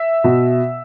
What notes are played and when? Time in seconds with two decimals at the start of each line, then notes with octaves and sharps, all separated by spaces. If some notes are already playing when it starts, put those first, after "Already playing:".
Already playing: E5
0.24 B2